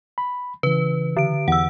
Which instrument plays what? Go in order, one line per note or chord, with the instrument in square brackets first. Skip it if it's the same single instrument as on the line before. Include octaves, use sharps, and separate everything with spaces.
[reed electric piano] B5
[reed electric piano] C#3 E3 [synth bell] B4
[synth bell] D3 D7
[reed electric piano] E2 [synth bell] F#5 E6